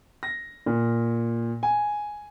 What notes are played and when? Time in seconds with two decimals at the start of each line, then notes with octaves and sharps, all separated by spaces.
0.23 A#6
0.66 A#2
1.63 G#5